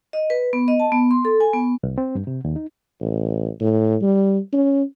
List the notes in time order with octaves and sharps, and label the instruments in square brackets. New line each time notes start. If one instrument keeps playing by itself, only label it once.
[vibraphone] D#5
B4
B3
D#5
A5
B3
C6
A4
G#5
B3
[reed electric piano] C2
C4
G2
C3
D#2
D#4
[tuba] A1
A2
G3
C#4